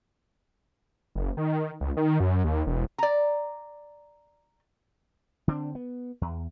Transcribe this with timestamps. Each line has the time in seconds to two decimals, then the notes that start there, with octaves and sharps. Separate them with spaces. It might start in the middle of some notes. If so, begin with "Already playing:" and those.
1.15 F#1
1.37 D#3
1.81 C#2
1.97 D#3
2.20 F#2
2.44 D#2
2.67 E1
2.98 D5 A#5
5.48 D3 C4 D4
5.75 B3
6.21 E2